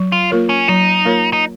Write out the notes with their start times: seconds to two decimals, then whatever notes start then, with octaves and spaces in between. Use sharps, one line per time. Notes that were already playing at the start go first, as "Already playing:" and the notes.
Already playing: F#3
0.12 F4
0.30 A#3 F4 A#4 C#5
0.49 C#4
0.68 F#3 D#4
1.05 A#3 F4 A#4 C#5
1.33 D#4